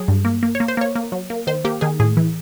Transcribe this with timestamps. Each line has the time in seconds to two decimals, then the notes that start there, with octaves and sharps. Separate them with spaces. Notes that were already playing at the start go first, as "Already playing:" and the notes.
Already playing: F#3 G#4
0.08 G2
0.25 A#3
0.43 A#3
0.55 C#5
0.60 A#3
0.68 C5
0.77 A#3 C#5
0.95 A#3
1.12 F#3
1.30 A#3
1.47 D#3 C5
1.65 A#3 G4
1.81 D#3 G#4
2.00 A2 G#4
2.17 E3